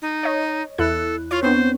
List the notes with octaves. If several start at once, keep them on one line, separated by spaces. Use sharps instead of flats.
D#4
C#5 D#5
E2 E4 A4 F#6
F4 C#5 C#6
B3 C4 D4 C5